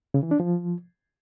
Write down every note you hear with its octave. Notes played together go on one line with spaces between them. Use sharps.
C#3
E3
D4
F3